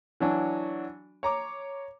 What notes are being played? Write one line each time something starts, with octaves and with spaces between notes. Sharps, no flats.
E3 F#3 D4 F#4
C#5 A#5 D6